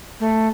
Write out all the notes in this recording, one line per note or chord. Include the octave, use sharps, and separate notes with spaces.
A3